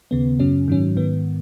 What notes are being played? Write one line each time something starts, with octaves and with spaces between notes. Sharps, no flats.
D#2 C#3 B3
F#2 C#3 F#3 C#4
G#2 D#3 F#3 C#4
G#2 D#3 B3